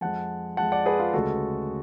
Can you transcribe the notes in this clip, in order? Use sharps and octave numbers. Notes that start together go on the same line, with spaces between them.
F2 F3 G#3 F#5 A5
F2 F3 G#3 F#5 A5
D5 F#5
G#4 B4
F4 G#4
D2 C#3 G#3 F#4 A4